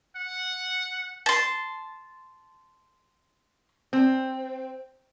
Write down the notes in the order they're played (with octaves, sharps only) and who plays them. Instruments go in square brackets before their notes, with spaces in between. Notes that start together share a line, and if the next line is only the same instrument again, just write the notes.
[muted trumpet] F#5
[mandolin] A5 C6
[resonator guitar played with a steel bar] C4